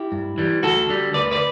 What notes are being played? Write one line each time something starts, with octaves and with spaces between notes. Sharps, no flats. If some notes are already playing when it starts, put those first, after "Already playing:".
Already playing: E4 G4
G2
E3 G3
D2 F#4 A4
D3 G3
D2 B4 D5
B4 D5